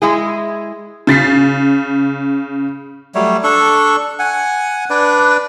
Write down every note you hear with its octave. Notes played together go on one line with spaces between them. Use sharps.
G#3 E4 G#4
C#3 A6 B6 C7
F#3 G3 A3 C#5
D4 A4 C#6
F#5 G#5
D4 B4 D5